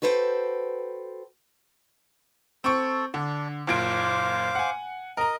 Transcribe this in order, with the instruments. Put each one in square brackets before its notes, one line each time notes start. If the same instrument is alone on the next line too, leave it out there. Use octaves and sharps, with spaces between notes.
[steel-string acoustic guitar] F#4 A4 B4 C5 D#5 G5
[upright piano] C4 C#6 [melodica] A4
[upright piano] D3 [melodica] D4
[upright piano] F#1 A#2 D7 [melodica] C5 F5 D6
[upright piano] F#5 G#5
[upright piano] A#4 A#5 [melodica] D#5